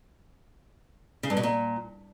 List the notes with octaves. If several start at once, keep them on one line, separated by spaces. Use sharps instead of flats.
C#3
G2
B2
A#2